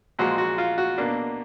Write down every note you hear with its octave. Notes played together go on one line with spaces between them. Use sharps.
A#2 F3 G#3 F#4
F#4
F4
F#4
B2 A#3 D4